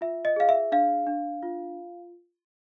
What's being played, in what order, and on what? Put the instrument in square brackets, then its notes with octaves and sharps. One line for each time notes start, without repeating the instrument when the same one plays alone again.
[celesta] F4 E5
D#5
G#4 F5
E5
D4 F5
D4
F4